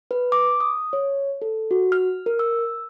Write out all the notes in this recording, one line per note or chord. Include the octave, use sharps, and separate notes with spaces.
B4
D6
D#6
C#5
A4
F#4
F6
A#4
E6